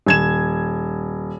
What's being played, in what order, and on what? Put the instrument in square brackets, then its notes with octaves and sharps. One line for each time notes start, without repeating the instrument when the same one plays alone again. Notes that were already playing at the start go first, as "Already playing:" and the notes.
[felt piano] D#1 G#6 E7